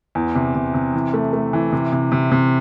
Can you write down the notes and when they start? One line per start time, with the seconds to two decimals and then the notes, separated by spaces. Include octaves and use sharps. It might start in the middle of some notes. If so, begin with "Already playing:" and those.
0.15 E2
0.35 C3
0.55 C3
0.74 C3
0.94 E3
1.14 A3
1.33 A3
1.53 E3
1.72 C3
1.92 C3
2.12 C3
2.31 C3